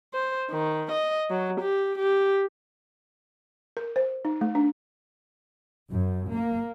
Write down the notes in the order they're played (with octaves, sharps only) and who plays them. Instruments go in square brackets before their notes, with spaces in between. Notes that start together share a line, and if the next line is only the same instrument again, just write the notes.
[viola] C5
D#3
D#5
F#3
G4
G4
[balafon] A#4
C5
D#4
A3
D4
[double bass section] F#2
A#3